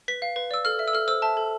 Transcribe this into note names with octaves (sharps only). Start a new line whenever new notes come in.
B4 B6
F5
B4
D5 E6
A4 F6
E5
E6
A4 F6
C5 E6
E5 A5
A4